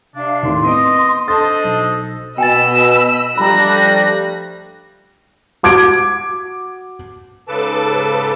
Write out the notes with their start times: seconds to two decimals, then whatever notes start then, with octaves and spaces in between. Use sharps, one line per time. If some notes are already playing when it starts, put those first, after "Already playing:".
0.15 C3 D4 F5
0.43 D#2 A2 C6
0.64 B3 C4 D#5 D7
1.28 D4 A4 C5 D#5 A5 A6
1.64 B1
2.38 B2 D#5 G5 G#5 B5 E6 A6
3.38 F3 G3 A3 D4 A#5 B5 F#6 A#6
5.63 F#4 D6 G#6 D7
7.48 G#2 C#3 A4 B4 A5 D6